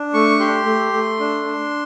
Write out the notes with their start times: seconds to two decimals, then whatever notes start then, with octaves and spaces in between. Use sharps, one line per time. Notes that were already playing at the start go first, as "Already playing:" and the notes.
Already playing: D4
0.14 A3 C#6
0.40 G4 C6
0.66 A3
0.93 A3
1.20 D4
1.45 D4